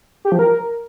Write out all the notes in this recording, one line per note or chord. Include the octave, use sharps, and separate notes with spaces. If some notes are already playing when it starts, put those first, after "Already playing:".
G4
F3
A#4